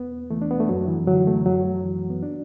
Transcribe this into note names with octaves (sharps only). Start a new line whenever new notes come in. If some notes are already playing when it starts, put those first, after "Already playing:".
Already playing: E2 B3
E3 A3
D4
B3
A3
F#2 F#3
E3
D3 F#3
A3
F#2 F#3
E3
B3
D4